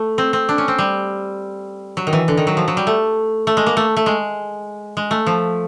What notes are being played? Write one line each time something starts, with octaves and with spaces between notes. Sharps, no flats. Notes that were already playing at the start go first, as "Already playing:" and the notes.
Already playing: A3
C4
C4
D4
C#4
C4
G3
F#3
D#3
E3
D3
D#3
F#3
F3
F#3
G3
A3
A3
G#3
A#3
A3
A3
G#3
G#3
A3
F3